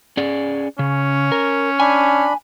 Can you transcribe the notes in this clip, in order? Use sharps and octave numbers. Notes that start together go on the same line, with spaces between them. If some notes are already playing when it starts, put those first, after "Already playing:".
C#4 G#4 D5
C#3 C#4
A#4
D4 G#5 B5